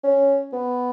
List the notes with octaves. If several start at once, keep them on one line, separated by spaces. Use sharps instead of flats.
C#4
B3